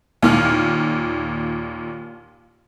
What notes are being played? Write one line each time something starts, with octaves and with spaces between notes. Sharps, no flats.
D#2 A#2 F6